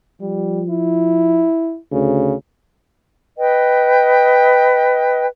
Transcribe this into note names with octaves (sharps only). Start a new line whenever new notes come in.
F3 G3
E4
D2 C#3
B4 D#5 G5